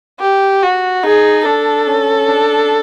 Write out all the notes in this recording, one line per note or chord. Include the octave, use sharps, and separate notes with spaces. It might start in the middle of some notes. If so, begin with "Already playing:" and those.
G4
F#4
D#4 G#4
D4 A4
C#4
D4